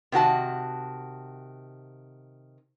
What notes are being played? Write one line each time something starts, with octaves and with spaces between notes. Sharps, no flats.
C3 D#3 F#4 A5